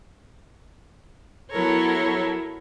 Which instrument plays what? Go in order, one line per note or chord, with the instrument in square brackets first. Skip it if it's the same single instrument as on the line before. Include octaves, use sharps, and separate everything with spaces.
[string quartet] F#3 B3 E4 A4 A#4 C#5